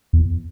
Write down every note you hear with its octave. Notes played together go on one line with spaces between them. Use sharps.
E2